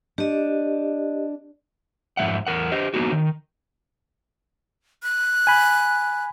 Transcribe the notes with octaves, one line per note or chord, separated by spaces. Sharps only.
D4 G4 D#5
F2 G#2 G#3 E5 F#5
E2 A#4 F#5
G4 C5 D#5
A#3 B3 D#4 F#4
D#3
F#6
G#5 B5